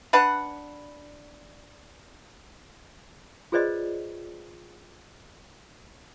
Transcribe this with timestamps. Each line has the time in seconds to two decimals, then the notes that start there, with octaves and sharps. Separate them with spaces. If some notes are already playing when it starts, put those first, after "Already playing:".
0.13 D4 B4 F#5
3.52 F4 G#4 B4 C5 D5 D#5